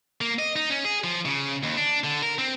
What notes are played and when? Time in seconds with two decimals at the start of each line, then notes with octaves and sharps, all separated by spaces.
0.21 A#3
0.39 D#5
0.56 D#4
0.70 C#4
0.85 G#4
1.04 F3
1.25 C#3
1.63 D#2
1.77 D4
2.04 D3
2.23 A#4
2.39 C4